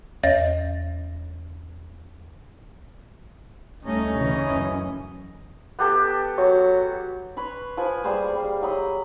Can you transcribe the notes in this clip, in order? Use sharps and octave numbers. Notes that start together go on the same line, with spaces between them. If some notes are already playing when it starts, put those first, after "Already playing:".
E2 C#5 D#5 A6 A#6
D2 G3 A3 C#4 D#4 D#5
C#3 E3
F#2
B3 G4 A4
F#3 C#6
B4 C#5 B5 C6
F3 B4 G#5
G3 A#3 G#4 C5
G3
F#3 D#5 B5